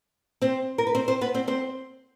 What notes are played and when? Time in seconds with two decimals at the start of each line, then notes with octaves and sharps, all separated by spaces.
0.41 C4 C5
0.78 A#4
0.87 B4
0.95 C4 C5
1.08 C4 C5
1.21 B3 B4
1.35 C4 C5
1.48 C4 C5